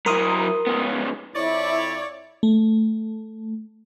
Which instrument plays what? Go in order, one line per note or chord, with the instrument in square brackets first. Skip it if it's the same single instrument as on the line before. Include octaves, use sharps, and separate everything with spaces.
[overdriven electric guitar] F#3 E4 [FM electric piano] A#4 C6 D#6
[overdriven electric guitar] C#2 B3
[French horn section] F2 E4 [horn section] C#5 D5
[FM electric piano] A3